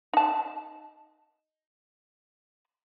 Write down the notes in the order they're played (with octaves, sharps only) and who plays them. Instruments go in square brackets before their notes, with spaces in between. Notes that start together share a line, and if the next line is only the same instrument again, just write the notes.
[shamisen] D#4 A5